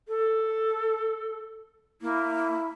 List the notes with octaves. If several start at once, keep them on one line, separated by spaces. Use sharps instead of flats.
A4
A#3 E4